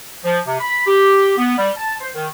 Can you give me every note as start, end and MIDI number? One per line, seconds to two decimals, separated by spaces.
0.25 0.39 53
0.47 0.56 48
0.60 0.85 83
0.87 1.33 67
1.38 1.56 59
1.58 1.70 55
1.77 1.95 81
2.01 2.09 72
2.15 2.27 51